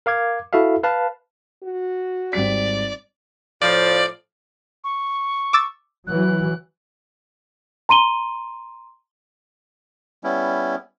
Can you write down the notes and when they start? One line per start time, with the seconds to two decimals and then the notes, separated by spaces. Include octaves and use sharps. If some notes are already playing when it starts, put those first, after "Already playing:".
0.06 A#4 F5 D6 G#6
0.53 E4 F#4 A4 E5 F5
0.83 B4 F5 A5
1.64 F#4
2.33 G#1 G3 D5 B6
3.62 A2 F3 D5
4.84 C#6
5.53 D6 E6 A6
6.07 E3 F#3 F#6
7.89 A#5 C6 D#7 G7
10.24 G3 B3 C#4 E4